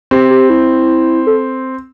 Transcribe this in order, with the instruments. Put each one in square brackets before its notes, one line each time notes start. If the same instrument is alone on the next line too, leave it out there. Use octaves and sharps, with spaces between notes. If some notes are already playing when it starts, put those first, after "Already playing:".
[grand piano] C4 [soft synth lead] G4
[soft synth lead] G4
E4
A4